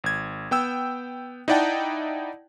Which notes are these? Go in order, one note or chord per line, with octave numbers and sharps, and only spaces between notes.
G#1 G#6
B3 G5 E6
D#4 E4 D5 F#5 G5 A5